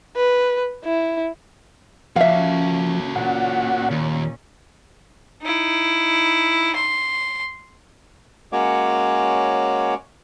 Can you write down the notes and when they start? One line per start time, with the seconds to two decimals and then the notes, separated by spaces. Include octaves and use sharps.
0.16 B4
0.84 E4
2.16 F3 A#3 C#4 F#4 A4 E5 F5
3.16 A#2 C#4 F#5
3.91 D#2
5.42 D#4 E4
6.75 C6
8.53 G#3 A#3 C#4 F#4 C#5 D6